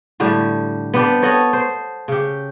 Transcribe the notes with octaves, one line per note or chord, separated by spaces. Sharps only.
A2 D3 G3 G4
B3 C4 D4 G4
A4 C#5 D#5 F#5
C5
C#3 G4